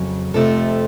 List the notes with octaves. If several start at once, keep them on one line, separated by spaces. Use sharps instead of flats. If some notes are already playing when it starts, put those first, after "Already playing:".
Already playing: F2 C#3 F#3
F2 C3 F3 A3 A4